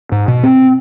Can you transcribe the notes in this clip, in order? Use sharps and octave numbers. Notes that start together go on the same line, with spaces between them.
G#2
B2
C4